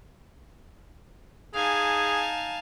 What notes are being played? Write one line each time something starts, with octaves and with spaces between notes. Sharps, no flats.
D#4 G#4 F5 G#5 A5